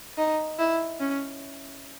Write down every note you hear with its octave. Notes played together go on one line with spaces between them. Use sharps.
D#4
E4
C#4